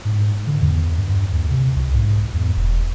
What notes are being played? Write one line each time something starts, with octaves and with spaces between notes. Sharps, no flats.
G#2
D3
E2
G2
D#2
C3
C2
G#2
E2
E1